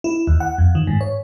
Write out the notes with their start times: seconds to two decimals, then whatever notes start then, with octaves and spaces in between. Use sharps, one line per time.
0.04 E4
0.27 D#2
0.40 F#5
0.58 F2
0.75 D#3
0.87 G#2
1.01 C#5